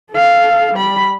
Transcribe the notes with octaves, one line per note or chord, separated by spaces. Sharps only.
A4 F5
G3 B5